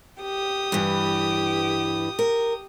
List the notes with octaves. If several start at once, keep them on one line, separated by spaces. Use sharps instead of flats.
G4 D#6
G2 E3
A#4